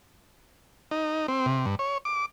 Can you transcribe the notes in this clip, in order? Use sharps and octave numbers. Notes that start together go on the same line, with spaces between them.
D#4
C4
C3
G2
C#5
D6